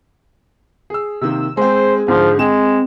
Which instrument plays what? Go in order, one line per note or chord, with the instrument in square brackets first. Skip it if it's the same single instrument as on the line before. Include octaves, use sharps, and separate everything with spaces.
[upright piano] G#4 E6
[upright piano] C3 D#3 A#3 [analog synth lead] E6
[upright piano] G#3 C4 [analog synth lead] G#4 [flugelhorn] C5
[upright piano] G#2 D3 [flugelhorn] F3
[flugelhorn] G#3 [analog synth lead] C4 [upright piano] E7